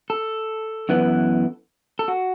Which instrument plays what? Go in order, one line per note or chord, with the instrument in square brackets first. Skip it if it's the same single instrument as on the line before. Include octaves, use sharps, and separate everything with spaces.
[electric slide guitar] A4
F#2 E3 B3
A4
F#4